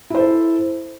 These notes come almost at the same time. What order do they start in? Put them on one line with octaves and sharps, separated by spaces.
E4 C5 A4